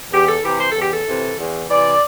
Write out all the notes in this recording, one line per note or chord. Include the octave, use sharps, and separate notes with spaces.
E2 G4
A4
C3 E3 G4
C5
E2 A4
G4
A4
C3 E3
E2
C3 E3 D5